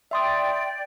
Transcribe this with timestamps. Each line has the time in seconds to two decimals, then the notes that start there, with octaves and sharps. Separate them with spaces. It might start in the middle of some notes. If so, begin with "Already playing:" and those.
0.11 D5 E5 G5 C6 D#6